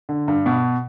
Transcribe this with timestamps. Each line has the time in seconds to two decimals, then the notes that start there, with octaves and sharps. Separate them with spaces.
0.09 D3
0.28 G2
0.46 B2